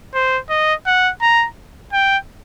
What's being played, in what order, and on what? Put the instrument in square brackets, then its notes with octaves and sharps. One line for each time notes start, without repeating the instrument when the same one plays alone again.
[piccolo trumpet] C5
D#5
F#5
A#5
G5